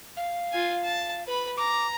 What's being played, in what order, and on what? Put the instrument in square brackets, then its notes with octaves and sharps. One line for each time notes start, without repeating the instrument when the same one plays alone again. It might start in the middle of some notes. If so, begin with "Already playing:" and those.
[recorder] F5
[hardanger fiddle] F4 G#5
A5
B4 B5
[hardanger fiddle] A#5 [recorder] D6